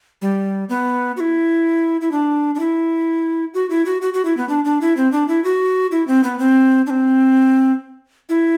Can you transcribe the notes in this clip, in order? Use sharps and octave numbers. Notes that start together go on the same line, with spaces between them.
G3
B3
F#4
E4
E4
D4
D4
E4
F#4
E4
F#4
F#4
F#4
E4
B3
D4
D4
E4
C4
D4
E4
F#4
E4
C4
B3
C4
D4
C4
E4